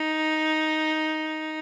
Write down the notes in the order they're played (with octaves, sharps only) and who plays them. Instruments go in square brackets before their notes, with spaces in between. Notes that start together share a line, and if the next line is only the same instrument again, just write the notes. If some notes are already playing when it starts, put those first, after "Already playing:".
Already playing: [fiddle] D#4